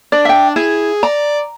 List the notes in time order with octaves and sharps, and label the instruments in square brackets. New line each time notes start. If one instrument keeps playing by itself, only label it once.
[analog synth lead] D4 [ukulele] D5
[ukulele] E5 G5
[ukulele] E4 [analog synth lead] G#4
[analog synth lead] D5 [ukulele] A#5